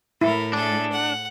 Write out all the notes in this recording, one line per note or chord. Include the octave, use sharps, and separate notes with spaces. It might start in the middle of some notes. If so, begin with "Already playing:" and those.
A2 E4 A4 A#4
D4 G#4 A4
F#5